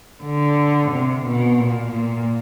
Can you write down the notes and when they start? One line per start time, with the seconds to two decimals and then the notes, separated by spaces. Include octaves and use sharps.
0.24 D3
0.92 C3
1.26 B2
1.60 A#2
1.93 A#2